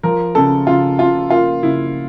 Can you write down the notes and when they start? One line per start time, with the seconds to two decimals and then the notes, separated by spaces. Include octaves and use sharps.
0.03 F3 A#4
0.35 C#3 A4
0.67 C#3 F4
0.99 C#3 F4
1.30 A#3 F4
1.63 C#3 E4